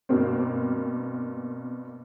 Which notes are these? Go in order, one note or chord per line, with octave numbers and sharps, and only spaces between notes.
G2 B2 A#3 C4